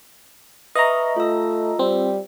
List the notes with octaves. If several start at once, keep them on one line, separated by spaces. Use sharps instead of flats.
B4 D#5 E5 A#5 C#6
A3 F4 E6
G3 C4